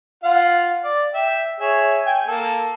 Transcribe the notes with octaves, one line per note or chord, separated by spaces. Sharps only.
F4 F5 F#5
D5
E5 G5
G#4 C#5 E5
G5 G#5
A#3 A4